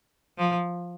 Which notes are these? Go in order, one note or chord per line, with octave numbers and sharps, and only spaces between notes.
F3